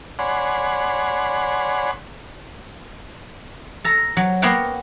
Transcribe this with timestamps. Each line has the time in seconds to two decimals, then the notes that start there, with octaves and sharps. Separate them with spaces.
0.19 C#5 D5 F#5 G#5 B5 C6
3.84 A4 A#5
4.17 F#3
4.42 A#3 B3 C5 C#5 F#5 G5